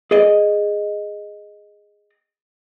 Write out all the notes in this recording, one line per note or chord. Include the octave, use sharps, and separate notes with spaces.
G#4 D5 D#5